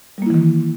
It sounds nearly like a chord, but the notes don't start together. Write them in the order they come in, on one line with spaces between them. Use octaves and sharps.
G3 A#3 E4 E3 D#3